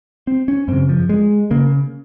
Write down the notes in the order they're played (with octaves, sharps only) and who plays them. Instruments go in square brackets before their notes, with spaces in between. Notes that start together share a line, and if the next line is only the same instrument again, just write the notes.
[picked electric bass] C4
C#4
F#2 C#3 C4
F3
G#3
C#3 A#3